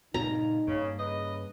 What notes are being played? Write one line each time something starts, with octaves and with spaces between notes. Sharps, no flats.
G2 A#2 C#3 D#4 A#5
G2 C#3 A#3
C#3 B4 D#5